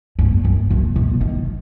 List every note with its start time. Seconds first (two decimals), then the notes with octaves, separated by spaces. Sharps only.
0.19 G2
0.45 F#2
0.70 F#2
0.96 B2
1.21 D#3